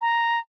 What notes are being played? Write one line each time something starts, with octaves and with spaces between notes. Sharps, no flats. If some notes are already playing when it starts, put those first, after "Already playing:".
A#5